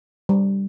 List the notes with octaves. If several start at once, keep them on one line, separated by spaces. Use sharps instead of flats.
G3